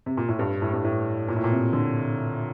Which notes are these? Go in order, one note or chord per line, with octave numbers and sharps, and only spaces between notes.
C3
A#2
A2
G2
A2
G2
A2
A#2
A2
A#2
C3
D3